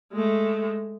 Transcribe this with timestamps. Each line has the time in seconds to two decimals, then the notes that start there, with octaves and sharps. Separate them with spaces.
0.13 G#3 A3